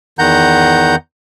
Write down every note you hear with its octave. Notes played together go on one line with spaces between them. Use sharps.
E2 D#3 F#5 A#5 G6